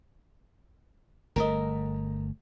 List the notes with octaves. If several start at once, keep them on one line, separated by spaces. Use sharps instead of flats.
G1 A3 A#4 D#5